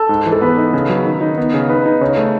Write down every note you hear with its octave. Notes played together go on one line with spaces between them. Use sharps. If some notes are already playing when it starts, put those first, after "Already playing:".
Already playing: A4
G#2
E3
A4
B3 B4
D#4
C#3
F#3
D#3
D#4
B3
C#3
D#4 B4
D#4
C#3 C#5
A3